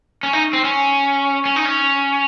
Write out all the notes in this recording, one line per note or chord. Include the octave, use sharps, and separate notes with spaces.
C#4
D#4
C4
C#4
C#4
D#4
C#4